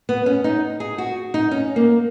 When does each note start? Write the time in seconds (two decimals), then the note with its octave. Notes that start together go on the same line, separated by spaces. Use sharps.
0.09 B3
0.26 C#4
0.44 D#4
0.80 G#4
0.98 F#4
1.34 D#4
1.51 C#4
1.76 A#3